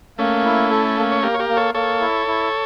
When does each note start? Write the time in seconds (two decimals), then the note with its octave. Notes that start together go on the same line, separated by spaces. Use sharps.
0.18 A3 A#3 C#4
0.45 E4
0.71 A4
0.97 A#3
1.11 C#5
1.23 A#3 G4 A#4
1.34 C#5
1.39 G4 A#4
1.49 A#3
1.57 A4 C#5
1.74 A#3 A4 C#5
2.01 E4
2.27 E4